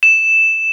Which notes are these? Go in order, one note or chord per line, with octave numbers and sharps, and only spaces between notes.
E7